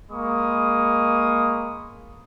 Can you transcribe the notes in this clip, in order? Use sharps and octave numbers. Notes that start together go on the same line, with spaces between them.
G#3 A#3 B5 C#6 D#6